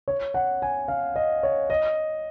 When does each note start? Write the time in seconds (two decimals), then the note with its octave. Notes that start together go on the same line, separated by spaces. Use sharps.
0.08 C#5
0.34 F#5
0.62 G#5
0.88 F5
1.16 D#5
1.43 C#5
1.70 D#5